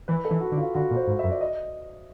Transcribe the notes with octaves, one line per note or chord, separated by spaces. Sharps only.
E3 B4
A4
E3
F#4
D3
F4
D3 F#4
A#2
C5
G#2
F#2 E5
D5
D#5